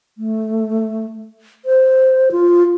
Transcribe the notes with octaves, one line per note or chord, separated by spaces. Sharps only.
A3
C5
F4